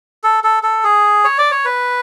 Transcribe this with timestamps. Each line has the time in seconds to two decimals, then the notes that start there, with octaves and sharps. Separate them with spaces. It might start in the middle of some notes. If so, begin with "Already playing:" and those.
0.24 A4
0.44 A4
0.63 A4
0.84 G#4
1.24 C#5
1.38 D5
1.51 C#5
1.65 B4